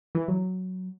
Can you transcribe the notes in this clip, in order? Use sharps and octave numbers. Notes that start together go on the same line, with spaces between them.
E3
F#3